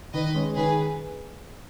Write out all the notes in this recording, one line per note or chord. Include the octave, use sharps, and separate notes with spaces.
D#3 B4 D#5
G#3 C#4
D#3 G#4 B4